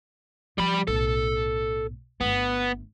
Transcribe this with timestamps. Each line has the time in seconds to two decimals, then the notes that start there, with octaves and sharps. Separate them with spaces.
0.58 C#3 F3 G3 B5
0.87 B1 A2 A4
2.21 G1 A3 B3